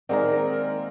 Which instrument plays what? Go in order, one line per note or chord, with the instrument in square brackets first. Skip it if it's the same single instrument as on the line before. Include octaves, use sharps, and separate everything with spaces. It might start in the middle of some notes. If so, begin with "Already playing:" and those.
[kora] D#3 G#3 A#3 [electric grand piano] C4 A#5 [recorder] A#4 [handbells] D5 F#5